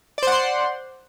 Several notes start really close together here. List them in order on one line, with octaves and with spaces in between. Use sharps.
D5 C5 F#5 C6